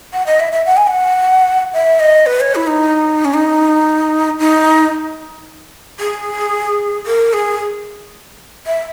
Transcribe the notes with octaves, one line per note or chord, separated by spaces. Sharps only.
F#5
D#5
E5
E5
F#5
G#5
F#5
E5
D#5
B4
C#5
E4
D#4
C#4
D#4
D#4
G#4
A#4
G#4
E5